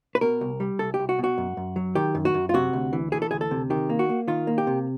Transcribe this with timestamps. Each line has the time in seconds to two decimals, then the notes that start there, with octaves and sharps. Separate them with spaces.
0.15 B4
0.21 B2 A#4
0.41 C2
0.60 G3
0.79 C2 A4
0.94 G4
0.99 C2
1.09 F#4
1.19 B2
1.24 F#4
1.38 F#2
1.57 F#2
1.76 F#3
1.95 D#3 G4
2.15 F#2
2.25 F#4
2.34 F#2
2.49 F4
2.54 C3 F#4
2.73 D2
2.93 E3
3.12 E3 G#4
3.22 A4
3.31 D2 G#4
3.41 A4
3.51 C3
3.70 D#3 G4
3.90 A#3
3.99 F#4
4.09 A#3
4.28 D#3 F4
4.47 A#3
4.58 G4
4.67 C3